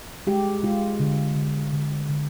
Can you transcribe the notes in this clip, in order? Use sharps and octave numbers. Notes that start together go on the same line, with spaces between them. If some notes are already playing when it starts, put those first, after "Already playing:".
G#3 G4
G#3 F4
D3
D3
D3
D3